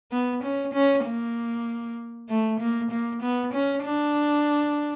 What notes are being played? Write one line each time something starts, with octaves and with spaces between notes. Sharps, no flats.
B3
C#4
C#4
A#3
A3
A#3
A#3
B3
C#4
D4